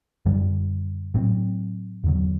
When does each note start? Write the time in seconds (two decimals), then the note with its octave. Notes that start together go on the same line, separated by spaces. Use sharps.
0.26 F#2 D3 G3
1.14 A2 F#3 C4
2.04 E2 D3 F#3